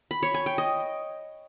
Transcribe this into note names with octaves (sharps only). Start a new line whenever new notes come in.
B5
C#5
G#5
G5
D#5